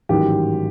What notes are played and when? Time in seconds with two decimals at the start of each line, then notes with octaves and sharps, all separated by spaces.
0.09 A1 G#2 D#3 F#3 G4